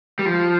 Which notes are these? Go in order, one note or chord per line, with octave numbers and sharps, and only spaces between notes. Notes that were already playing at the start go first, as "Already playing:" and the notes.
G3
F3